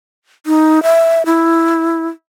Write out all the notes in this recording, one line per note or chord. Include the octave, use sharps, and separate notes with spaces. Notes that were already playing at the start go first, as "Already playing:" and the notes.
D#4
E5
E4